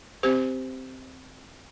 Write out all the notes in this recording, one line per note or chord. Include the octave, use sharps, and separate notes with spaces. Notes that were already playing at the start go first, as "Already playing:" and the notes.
C4 G4 C5